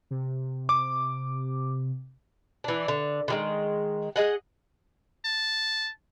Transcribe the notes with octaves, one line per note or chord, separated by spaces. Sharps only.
C3
D6
E3 D4
D3
D3 D#3 G#3
G#4 D#5 F#5
A5